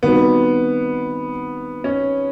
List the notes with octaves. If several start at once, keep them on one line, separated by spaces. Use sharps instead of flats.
D#3 G3 B3 C4 D#4 F#4
C#4